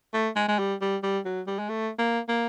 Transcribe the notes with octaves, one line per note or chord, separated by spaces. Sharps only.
A3
G#3
G#3
G3
G3
G3
F#3
G3
G#3
A3
A#3
A#3